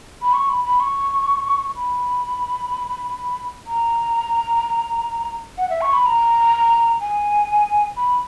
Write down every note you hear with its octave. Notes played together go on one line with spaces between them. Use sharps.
B5
C#6
B5
B5
C#6
B5
A#5
F#5
E5
C#6
B5
A#5
G#5
B5